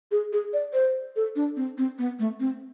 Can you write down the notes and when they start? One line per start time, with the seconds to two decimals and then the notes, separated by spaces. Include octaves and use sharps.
0.11 G#4
0.33 G#4
0.53 D5
0.74 C5
1.16 A4
1.36 D4
1.56 C4
1.78 C4
1.99 B3
2.19 A3
2.40 C4